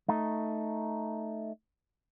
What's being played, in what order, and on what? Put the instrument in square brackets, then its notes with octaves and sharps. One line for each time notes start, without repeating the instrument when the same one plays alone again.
[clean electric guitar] A3 D#4